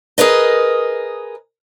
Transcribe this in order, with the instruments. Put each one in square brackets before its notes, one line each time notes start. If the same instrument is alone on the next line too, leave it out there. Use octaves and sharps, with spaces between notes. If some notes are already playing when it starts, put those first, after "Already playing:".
[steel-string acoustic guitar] G#4 A#4 B4 D#5